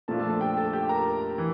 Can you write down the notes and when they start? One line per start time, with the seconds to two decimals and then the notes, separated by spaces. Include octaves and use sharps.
0.08 A#2 F3 A3 D4 F4 A4 A5
0.19 A4 A5
0.30 A4 A5
0.41 G4 G5
0.57 A4 A5
0.73 G4 G5
0.89 A#4 A#5
1.38 E3